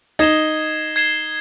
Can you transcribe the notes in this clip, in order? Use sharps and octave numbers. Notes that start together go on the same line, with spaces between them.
D#4 G#6 C7 E7 G7
G#6 C7 E7 G7